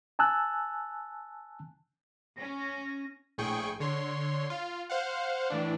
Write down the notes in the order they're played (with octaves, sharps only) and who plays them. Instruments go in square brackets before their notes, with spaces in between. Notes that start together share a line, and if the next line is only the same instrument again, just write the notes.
[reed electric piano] G#5 A5 E6 F#6
[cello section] C#4 [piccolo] A#6
[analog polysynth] A#1 A2 G#4 G5 C#6
D3 C#5 C6
F4
C5 F5 F#5
A2 E3 D4